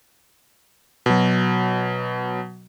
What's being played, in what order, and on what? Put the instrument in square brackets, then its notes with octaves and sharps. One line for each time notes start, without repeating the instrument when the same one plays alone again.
[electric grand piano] B2 F#3